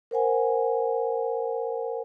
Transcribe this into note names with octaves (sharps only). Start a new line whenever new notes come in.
A#4 C5 F#5 G#5